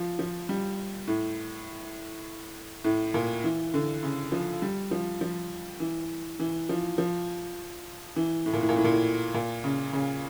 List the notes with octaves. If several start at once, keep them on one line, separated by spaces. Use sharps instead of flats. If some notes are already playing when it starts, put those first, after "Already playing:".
Already playing: F3
F3
G3
A2
A2
A#2
E3
D3
C#3
F3
G3
F3
F3
E3
E3
F3
F3
E3
A2
A#2
A2
A#2
A2
A#2
A2
A#2
C#3
C#3